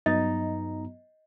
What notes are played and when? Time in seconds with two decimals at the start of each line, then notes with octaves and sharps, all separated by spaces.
0.06 G2 F#3 B3 D#4 D#5 A#5